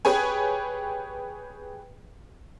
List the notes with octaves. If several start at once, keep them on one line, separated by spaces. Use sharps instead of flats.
G4 G#4 B4 C#5 G#5